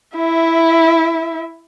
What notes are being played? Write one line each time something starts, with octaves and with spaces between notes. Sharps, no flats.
E4 E5